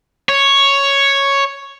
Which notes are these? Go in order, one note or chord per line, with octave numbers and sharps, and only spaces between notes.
C#5